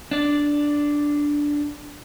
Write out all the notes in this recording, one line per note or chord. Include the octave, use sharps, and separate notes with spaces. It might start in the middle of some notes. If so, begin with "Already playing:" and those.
D4 D5